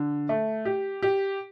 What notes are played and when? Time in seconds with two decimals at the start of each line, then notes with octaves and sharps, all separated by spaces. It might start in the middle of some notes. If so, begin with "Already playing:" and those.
Already playing: D3
0.29 A3
0.65 G4
1.02 G4